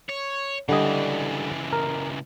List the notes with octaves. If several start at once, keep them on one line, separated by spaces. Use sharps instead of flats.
C#5
C#2 D3 E3 G3 D#5
A#4